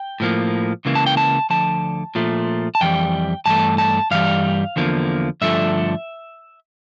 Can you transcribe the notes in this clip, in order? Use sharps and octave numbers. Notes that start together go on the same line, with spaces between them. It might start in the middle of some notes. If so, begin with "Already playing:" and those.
Already playing: G5
A2 F3 A#3
C#2 C#3 E3 A#3
A5
G5
A5
D2 D3 F3 A5
A#2 F3 A3
A5
F2 E3 G3 G5
G2 E3 A3 A5
A5
G2 E3 G3 F5
E2 D3 F3 A#3
G2 D3 F3 A3 E5